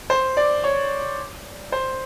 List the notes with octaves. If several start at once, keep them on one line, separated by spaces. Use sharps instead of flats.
C5
D5
C#5
C5